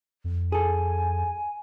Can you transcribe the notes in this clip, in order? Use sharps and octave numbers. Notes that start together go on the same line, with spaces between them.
F2
G#4 A4 G#5